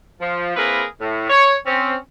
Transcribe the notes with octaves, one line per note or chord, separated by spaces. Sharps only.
F3
A#3 C4 E4 G#4 A#4 B4
A2
C#5
C4 C#4